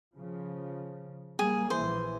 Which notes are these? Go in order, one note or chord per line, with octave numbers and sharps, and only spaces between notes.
C#3 F3
G3 A#3 G#4
A#1 E3 C5